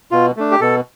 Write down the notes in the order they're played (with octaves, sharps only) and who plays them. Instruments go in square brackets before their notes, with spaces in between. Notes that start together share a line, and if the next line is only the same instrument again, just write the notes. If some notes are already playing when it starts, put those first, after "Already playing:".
[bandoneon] B2 F4
A3 D4
G4
B2 A4